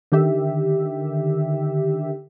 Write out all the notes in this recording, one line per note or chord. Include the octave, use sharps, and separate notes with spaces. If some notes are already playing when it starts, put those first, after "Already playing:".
D3 D#3 G4 E5